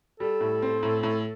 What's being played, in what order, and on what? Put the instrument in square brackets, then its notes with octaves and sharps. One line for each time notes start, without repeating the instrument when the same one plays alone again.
[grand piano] G3 [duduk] A4
[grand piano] A2
C4
A2
A2